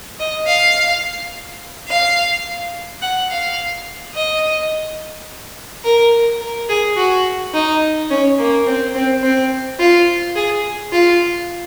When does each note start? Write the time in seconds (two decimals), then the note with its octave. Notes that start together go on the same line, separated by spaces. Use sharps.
0.19 D#5
0.47 F5
1.88 F5
3.02 F#5
3.30 F5
4.15 D#5
5.84 A#4
6.41 A#4
6.69 G#4
6.97 F#4
7.54 D#4
8.11 C#4
8.39 A#3
8.67 C4
8.95 C4
9.23 C4
9.80 F4
10.36 G#4
10.93 F4